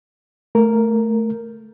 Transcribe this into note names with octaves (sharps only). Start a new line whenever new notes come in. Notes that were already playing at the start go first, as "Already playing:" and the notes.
A3 A#4